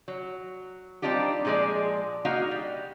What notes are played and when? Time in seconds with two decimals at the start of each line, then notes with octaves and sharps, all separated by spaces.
0.08 F#3
1.02 G3 C4 D4 D#4 F4 G4
1.45 A#2 F3 G#3 G#4 D5
2.25 A#3 D#4 F#4 D#5 F5
2.51 G3